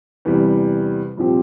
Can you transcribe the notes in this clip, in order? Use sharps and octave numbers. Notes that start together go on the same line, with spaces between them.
E2 C3 E3 G3
C2 A#2 F3 C4 G4